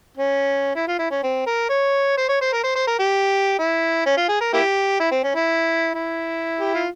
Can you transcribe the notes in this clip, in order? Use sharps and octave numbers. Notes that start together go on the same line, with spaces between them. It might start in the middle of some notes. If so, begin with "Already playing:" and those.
C#4
E4
F4
E4
C#4
C4
A#4
C#5
C5
C#5
C5
A#4
C5
C5
A#4
G4
E4
C#4
F4
G#4
A#4
A#3 E4 G4
E4
C4
C#4
E4
E4
G4
F4